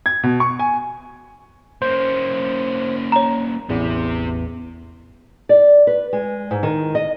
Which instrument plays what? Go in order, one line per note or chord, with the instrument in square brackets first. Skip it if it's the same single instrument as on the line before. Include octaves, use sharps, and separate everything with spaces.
[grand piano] G#6
B2
C#6
G#5
[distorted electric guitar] A#3 C#4 [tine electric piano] C5
[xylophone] C#5 A#5
[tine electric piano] A1 E2 [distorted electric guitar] C3
[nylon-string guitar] D5
B4
G#3
G#2
D#3
D#5